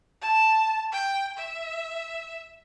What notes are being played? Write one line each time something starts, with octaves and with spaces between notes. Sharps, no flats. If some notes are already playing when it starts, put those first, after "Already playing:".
A5
G5
E5